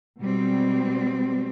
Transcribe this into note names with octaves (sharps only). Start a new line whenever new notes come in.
B2 G3 G#3 C4